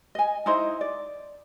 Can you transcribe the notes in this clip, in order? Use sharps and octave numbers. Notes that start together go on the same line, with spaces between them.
D#5 G#5
D#4 E4 C5 D#5
D5